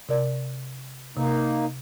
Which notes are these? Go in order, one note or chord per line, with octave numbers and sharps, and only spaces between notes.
C3 A#4 D5
C3 A#3 D#4 A#4